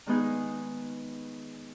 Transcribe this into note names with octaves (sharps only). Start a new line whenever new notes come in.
D#3 G#3 B3 D#4 G#4